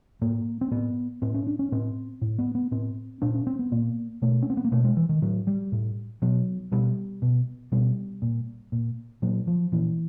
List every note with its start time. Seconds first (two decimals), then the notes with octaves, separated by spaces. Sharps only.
0.22 A2 A#3
0.61 C4
0.71 A2 B3
1.22 A2 C4
1.34 C#4
1.47 D4
1.59 C#4
1.72 A2 C4
2.21 A2
2.39 B3
2.55 B3
2.71 A2 C4
3.22 A#2 D4
3.34 C#4
3.47 C4
3.59 B3
3.72 A#2 A#3
4.22 B2 A3
4.42 C#4
4.50 C4
4.57 B3
4.64 A#3
4.72 B2 A3
4.84 G#3
4.97 E3
5.09 D#3
5.22 A2 F#3
5.47 G3
5.72 A2
6.22 B2 F#3
6.72 B2 G3
7.22 B2
7.72 B2 G3
8.22 A#2
8.72 A#2
9.22 A#2 F#3
9.47 F3
9.72 A#2 E3